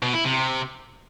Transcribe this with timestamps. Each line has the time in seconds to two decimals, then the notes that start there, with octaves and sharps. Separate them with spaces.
0.02 B2
0.14 E4
0.25 C3